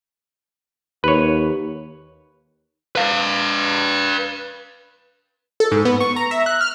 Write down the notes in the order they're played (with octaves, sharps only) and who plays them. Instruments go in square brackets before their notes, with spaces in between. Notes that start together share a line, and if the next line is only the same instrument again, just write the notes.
[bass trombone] D#2 [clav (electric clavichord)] B4 C#5
[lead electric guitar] B4 F5
[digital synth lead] A4
G#2
B3
C#6
A#5
E5
F#6
F6